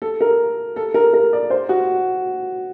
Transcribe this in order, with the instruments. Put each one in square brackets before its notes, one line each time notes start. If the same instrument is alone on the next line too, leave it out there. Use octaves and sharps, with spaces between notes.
[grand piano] A4
A#4
A4
A#4
A#4
D5
C5
F#4